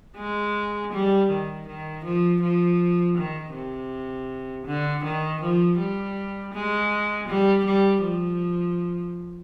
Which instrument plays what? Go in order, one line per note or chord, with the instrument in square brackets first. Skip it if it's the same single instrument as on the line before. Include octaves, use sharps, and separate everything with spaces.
[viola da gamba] G#3
G3
D#3
D#3
F3
F3
D#3
C3
D3
D#3
F3
G3
G#3
G3
G3
F3